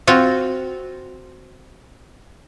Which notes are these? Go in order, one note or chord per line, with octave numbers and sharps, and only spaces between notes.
C4 F4 F#4